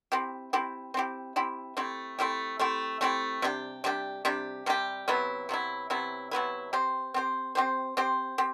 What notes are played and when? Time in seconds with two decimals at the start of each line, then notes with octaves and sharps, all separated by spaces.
0.12 C4 E4 G4
0.53 C4 E4 G4
0.94 C4 E4 G4
1.36 C4 E4 G4
1.77 A3 C4 E4 G4
2.19 A3 C4 E4 G4
2.59 A3 C4 E4 G4
3.01 A3 C4 E4 G4
3.42 C3 G3 D4 G4
3.84 C3 G3 D4 G4
4.25 C3 G3 D4 G4
4.66 C3 G3 D4 G4
5.08 C3 F#3 B3 E4
5.49 C3 F#3 B3 E4
5.90 C3 F#3 B3 E4
6.31 C3 F#3 B3 E4
6.73 C4 G4 C5
7.14 C4 G4 C5
7.55 C4 G4 C5
7.97 C4 G4 C5
8.38 C4 G4